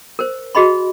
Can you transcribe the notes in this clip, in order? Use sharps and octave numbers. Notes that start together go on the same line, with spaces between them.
A#4 C5
F#4 G#4 D#5 B5 C6